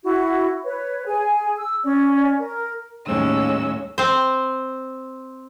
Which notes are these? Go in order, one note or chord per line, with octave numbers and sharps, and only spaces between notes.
E4 F#4
B4 C#5
G#4 G#5
E6
C#4 D5
A#4
D#2 A2 G3 G#3 C#4 E6
C4 C5